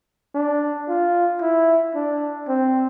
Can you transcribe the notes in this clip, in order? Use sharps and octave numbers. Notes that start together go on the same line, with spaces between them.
D4
F4
E4
D4
C4